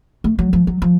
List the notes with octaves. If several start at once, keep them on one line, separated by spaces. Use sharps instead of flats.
A3
F#3
F3
F#3
F3